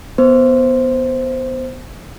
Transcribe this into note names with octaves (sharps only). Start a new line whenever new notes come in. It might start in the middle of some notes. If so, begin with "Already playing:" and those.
B3 C5